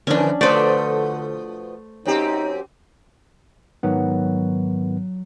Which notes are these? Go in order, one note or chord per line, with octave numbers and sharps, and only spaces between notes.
D3 E3 F3 C#4 D4
B2 D3 F3 A3 B4 C5 D5
F#2 C4 D#4 G4
G#2 D#3 F#3 B3